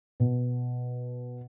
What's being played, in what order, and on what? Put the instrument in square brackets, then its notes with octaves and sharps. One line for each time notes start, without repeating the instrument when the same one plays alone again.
[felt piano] B2